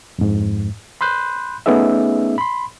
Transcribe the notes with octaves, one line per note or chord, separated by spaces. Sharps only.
F2 G#2
B5 C6 F#6 G6
A3 B3 C#4 D#4 G#4 E5
B5 C6